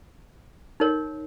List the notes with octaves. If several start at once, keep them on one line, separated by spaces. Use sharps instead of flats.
D#4 A#4 C#5